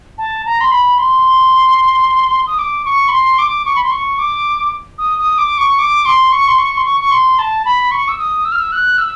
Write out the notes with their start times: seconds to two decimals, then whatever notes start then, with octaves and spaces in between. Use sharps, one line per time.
0.18 A5
0.46 A#5
0.61 C6
0.71 B5
0.98 C6
2.47 D#6
2.59 D6
2.85 C#6
3.08 B5
3.12 C6
3.39 D6
3.65 C#6
3.76 B5
3.84 C6
3.91 C#6
4.18 D6
4.98 D#6
5.19 D#6
5.38 D6
5.58 C#6
5.79 D6
6.05 C6
6.32 C#6
6.48 C6
6.58 C#6
6.77 C6
6.85 C#6
7.00 C#6
7.11 C6
7.39 A5
7.65 B5
7.91 C#6
8.08 E6
8.19 D#6
8.45 E6
8.52 F6
8.58 E6
8.72 F#6
8.98 E6